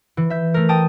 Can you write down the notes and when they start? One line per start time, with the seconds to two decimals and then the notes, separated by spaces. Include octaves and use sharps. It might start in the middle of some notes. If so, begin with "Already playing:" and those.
0.17 E3
0.30 E5 G6
0.54 A3 A#4
0.69 G5 A5 D#6